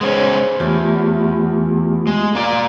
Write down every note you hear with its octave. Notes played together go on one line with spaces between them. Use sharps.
G#3 B3 C#4 G#4 C5 C#5
E2 A3 F4 G4
G#3
A#3 D5